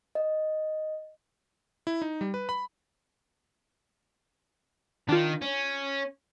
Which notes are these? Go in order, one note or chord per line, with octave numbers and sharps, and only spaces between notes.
D#5
E4
D#4
G3
B4
B5
D#3 D4 F4
C#4